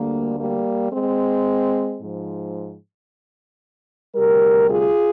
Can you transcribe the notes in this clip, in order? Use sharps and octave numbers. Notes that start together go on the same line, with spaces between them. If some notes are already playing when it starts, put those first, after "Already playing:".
Already playing: D2 D3 G3 A#3
G3 A#3
G#3 C4
G#2 F3
D2 C3 G3 G4 A#4
F4 G#4